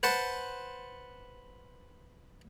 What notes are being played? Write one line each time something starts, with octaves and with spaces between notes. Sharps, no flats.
B4 C5 F#5 A5 C6